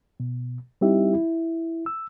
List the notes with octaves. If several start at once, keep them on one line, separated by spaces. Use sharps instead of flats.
B2
G3 C4 D#4 E4 G4 E5
E4
E6